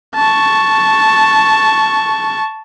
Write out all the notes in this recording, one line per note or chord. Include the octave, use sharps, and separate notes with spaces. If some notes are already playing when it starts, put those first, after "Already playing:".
A5 C#6